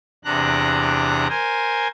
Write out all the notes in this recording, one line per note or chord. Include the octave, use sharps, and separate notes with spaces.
E2 C3 D4 A#5 F#6
A#4 C5 G#5